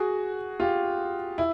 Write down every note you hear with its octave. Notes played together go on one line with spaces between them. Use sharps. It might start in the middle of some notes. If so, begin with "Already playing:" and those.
Already playing: F#4 G#4
F4 G4
E4